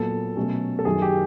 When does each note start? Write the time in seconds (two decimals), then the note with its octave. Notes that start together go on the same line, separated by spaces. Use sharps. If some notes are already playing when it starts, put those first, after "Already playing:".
Already playing: A#2 F#3 B3 A4
0.36 B2 F#3 A3 C#4
0.79 A4
0.85 F#2 D#3 F#3 G#4
1.02 G4